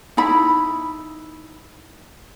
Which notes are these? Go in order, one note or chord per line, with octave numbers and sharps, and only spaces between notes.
D#4 E4 B5